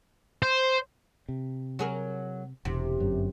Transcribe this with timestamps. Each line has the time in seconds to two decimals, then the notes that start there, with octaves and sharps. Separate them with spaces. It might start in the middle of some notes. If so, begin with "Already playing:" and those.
0.43 C5
1.29 C3
1.79 F#3 G#4 A#4
2.65 E1 C3
3.00 G1 F#2